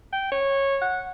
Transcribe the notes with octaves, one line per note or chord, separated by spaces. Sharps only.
G5
C#5
F#5